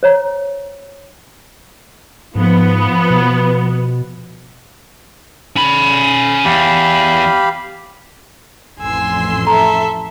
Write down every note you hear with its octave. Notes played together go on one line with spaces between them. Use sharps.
C5 C#5 A#5
G#2 F3 B3
B2
C#4 B5
E2 G4 F5 B5
A1 F2 G#5 C6 E6
A4 E5 A#5